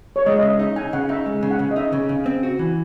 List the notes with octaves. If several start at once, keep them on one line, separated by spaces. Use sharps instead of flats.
C#5
G#3 D#5
D#5
C#3 E5
D#4 E5
D#4 G#5
C#3 F#5
D#4 E5
G#3
C#3
F#5
C#3
D#5
D#4 E5
C#3
C#3
C4
F#4
E3